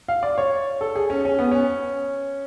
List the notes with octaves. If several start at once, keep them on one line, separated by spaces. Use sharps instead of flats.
F5
D5
C#5
A4
G#4
C#4
C#4
B3
C#4